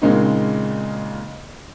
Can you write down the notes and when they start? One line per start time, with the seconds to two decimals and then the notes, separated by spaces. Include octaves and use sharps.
0.02 A#2 C#3 G#3 A#3 C4 D#4